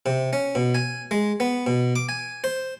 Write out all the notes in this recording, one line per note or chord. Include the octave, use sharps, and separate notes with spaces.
C3
C#4
B2
G#5
G#3
B3
B2
D6
G#5
C5